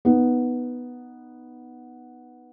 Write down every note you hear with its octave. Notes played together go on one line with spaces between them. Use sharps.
B3 D#4